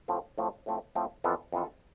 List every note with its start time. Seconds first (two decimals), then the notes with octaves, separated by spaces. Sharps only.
0.08 A2 F3 A3 C4
0.38 A2 F3 A3 C4
0.66 A2 F3 A3 C4
0.95 A2 F3 A3 C4
1.24 F2 E3 B3 F4 A4
1.53 F2 E3 B3 F4 A4